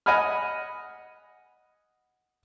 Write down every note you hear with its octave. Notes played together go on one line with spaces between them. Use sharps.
D#5 F#5 G#5 B5 F6